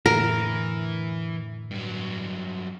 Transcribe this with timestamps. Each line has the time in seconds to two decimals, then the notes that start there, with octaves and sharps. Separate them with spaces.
0.06 F2 A2 D3 E3 A#4
1.71 G2 F#3